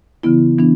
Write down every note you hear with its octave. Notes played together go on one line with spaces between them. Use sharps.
C#3 E3 B3 E4
E3 B3 D4